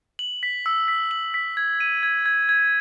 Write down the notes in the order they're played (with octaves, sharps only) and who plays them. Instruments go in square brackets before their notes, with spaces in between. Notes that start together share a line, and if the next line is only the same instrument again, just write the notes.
[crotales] F#7
B6
E6
B6
F#7
B6
G#6
D#7
G#6
G#6
G#6